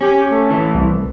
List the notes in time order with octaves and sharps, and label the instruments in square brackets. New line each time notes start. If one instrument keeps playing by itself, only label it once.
[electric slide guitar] C#4 [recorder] G4
[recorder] A3
[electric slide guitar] A2 E3
[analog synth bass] C2